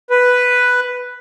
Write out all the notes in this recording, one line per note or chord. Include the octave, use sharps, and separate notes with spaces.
B4